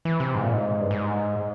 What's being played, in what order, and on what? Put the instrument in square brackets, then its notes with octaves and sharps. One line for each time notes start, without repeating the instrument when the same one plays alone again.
[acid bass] E3
C3
G#2
A#2
G#2
G2
G#2